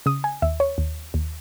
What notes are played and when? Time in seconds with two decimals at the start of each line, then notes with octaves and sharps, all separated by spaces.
0.06 C#3 D#6
0.24 G#5
0.42 D#2 E5
0.60 C#5
0.78 D#2
1.14 D#2